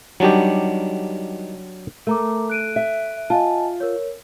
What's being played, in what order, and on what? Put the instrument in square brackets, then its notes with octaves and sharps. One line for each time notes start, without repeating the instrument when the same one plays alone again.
[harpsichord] D#3 G3 F#4 [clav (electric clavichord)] F#3 D4 G4
[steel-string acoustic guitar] A3 [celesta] A#4 A#5 D6
[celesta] F#6 D7 D#7
[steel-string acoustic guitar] E5
[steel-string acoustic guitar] F4 [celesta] D#5 G#5 A5
[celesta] A#4 C#5